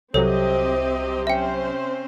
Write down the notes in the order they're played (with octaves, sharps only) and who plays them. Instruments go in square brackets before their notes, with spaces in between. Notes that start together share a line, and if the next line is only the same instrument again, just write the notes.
[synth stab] C2 F#3 [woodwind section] C3 [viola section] C4 G4 D#5 [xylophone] A4 C#5
[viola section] C4 C#4 C5 [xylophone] E5 G5